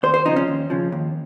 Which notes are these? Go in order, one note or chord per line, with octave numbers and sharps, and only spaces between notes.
D#2 C5
C5
C#3 F3 D#4
C#4
D#2
C#3 F3
D#2